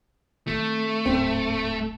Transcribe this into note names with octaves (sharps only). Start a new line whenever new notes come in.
D#3 A3 C4
D1 G#2 C4